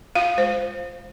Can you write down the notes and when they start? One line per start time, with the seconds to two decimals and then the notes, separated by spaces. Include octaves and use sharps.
0.15 F4 F5
0.38 G#3 C5